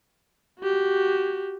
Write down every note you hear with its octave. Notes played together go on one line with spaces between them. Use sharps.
F#4 G4